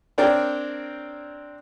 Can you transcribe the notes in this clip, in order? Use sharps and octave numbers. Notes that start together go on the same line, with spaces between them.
C4 D4 A#4 C#5 D5 G5